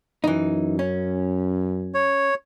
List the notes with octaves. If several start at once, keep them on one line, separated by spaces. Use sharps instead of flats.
F#2 E3 D#4
C#4
C#5